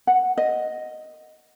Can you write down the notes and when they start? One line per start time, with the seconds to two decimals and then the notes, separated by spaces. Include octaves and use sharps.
0.07 F#5
0.38 D#5